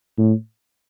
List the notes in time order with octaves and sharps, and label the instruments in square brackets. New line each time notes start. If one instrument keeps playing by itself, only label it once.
[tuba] A2